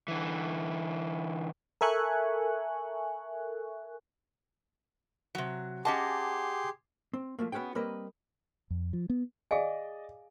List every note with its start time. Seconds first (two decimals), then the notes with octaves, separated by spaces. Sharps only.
0.08 D3 E3
1.81 A4 A#4 E5 G#5 C#6 F#6
5.35 C3 F#3
5.85 C#4 G4 G#4 D#5 F#5 A5 C6 D6
7.13 C4
7.39 F3 A3 A#3
7.52 B3 C#4 F#4 G#4 G5
7.75 G3 A#3 C4 A#4 B4 D#5
8.70 F2
8.93 F3
9.10 B3
9.51 G#4 D5 D#5 F5 G#5